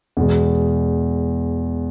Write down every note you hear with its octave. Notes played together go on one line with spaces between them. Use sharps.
E2 B2 G#3